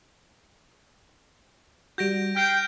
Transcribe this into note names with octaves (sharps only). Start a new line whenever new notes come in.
G3 F#4 G6 A#6 D7
G5 F6 G6 B6 C7